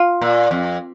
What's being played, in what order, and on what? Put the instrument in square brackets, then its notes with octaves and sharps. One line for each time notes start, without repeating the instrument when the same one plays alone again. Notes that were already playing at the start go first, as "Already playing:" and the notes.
Already playing: [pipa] F4
[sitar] A#2
F2